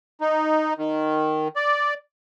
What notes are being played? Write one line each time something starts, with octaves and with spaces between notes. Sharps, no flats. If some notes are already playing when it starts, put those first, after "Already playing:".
D#4
D#3
D5